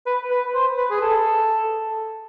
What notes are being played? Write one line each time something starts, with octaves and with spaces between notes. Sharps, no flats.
B4
B4
C5
B4
G#4
A4